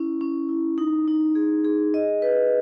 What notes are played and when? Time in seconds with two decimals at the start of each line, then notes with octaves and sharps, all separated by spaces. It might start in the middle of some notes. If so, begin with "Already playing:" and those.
Already playing: C#4 E4
0.21 C#4
0.49 E4
0.78 D#4
1.08 D#4
1.35 G#4
1.65 G#4
1.94 D#5
2.22 B4